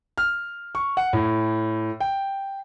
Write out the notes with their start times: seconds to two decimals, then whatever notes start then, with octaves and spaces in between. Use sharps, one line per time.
0.18 F6
0.75 C#6
0.97 F#5
1.13 A2
2.00 G5